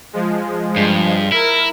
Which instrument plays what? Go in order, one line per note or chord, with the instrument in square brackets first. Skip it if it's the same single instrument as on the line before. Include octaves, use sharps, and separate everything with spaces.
[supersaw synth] F3 G#3
[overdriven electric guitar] G2
[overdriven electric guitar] E4 [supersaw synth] A#4